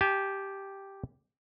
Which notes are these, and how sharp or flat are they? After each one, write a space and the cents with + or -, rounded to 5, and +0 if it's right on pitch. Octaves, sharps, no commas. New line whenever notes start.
G4 +0 A5 -45